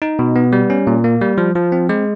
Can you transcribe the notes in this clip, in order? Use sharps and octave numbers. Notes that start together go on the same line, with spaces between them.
D#4
B2
B3
G3
C#4
A#2
A#3
G3
F3
F3
C4
G#3